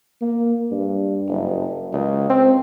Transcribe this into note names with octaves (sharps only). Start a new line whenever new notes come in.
A#3
G2
F#1
C#2
C4